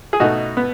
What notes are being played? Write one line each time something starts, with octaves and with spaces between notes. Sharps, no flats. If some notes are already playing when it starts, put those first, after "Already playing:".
G#4
B2 A3 D#4 F#4
B3